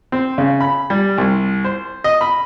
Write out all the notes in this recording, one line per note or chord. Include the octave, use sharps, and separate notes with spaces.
C4
C#3
B5
G3
C2
C5
D#5
B5